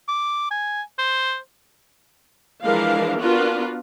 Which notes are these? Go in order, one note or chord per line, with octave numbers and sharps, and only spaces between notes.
D6
G#5
C5
E3 F3 G#3 D4 A#4 F5
B3 D4 F4 F#4 A#4 B4